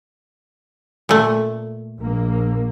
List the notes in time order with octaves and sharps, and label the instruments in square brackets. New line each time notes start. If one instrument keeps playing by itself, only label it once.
[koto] A#2 A3
[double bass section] A#1 A#3